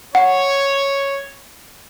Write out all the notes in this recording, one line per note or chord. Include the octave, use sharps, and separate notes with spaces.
C#5 F#5